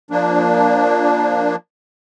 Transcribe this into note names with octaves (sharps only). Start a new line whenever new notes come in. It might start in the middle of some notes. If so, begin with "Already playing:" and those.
F3 A#3 D4